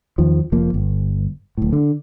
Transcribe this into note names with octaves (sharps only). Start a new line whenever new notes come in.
E2 D#3 F3
F1 F3 A#3
G1
D1 A2
D3